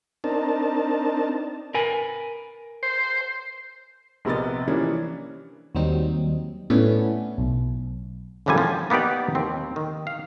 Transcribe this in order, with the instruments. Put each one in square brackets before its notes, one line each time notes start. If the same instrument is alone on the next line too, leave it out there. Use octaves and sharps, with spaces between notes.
[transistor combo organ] C4 D4 D#4 A#4 A5
[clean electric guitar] A#4 B4 G#5
[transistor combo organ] C5
[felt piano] A#1 C3 B3 A#4 D#5 A6
E3 F3 G3 A#3 C#4 D4
[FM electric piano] D#2 F#3 G3 C4 D#4
A2 B3 C#4 D4 E4
B1
[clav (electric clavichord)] G#1 F#2 D3 F3 G3 G#5
F3
A#3 B3 D#4 G4 D5
D#2 C4
D#3
F5